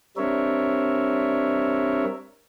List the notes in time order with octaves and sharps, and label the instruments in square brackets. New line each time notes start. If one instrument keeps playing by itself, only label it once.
[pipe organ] G3 C4 D4 A#4 C#5 E5